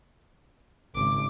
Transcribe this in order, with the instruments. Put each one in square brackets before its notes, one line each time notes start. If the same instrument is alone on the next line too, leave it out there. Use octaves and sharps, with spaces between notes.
[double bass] G#1 C#3 [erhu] D6